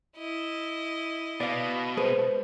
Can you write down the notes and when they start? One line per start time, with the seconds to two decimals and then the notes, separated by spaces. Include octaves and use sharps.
0.17 E4 D#5
1.41 B2 D5 F5
1.97 G#3 G#4 B4 C5